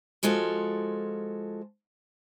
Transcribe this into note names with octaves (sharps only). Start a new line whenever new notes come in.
F3 G#3 F4 F#4 A4